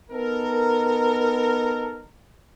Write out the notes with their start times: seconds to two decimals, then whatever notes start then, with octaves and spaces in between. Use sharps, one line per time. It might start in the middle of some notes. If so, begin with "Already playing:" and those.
0.11 B3 D#4 A4 A#4